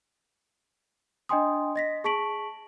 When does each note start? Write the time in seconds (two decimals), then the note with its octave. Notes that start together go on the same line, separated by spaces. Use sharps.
1.29 D4 D#5 G5 G#5 C6 D#6
1.76 D#5 A#6 B6
2.04 G#4 A5 C#6 B6 D7 F#7